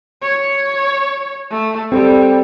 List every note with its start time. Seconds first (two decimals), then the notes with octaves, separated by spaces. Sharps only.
0.22 C#5
1.50 A3
1.92 G3 C4 A4